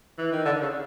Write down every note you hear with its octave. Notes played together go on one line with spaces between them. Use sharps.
E3
D#3
D3
C#3